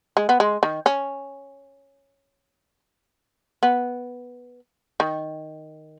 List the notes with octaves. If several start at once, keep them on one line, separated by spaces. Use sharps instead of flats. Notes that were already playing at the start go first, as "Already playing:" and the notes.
G#3
B3
G#3
D#3
C#4
B3
D#3